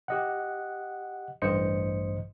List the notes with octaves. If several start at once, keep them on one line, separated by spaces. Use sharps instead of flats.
G4 D#5 F#5
A1 G2 C5 D#5 C#7